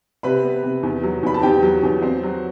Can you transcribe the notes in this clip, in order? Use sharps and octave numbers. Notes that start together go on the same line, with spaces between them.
C3 B4 B5
B3
C3
E2
F#3
E2 B5
A5
E2 G4 G5
F#3
E2
C4
F#3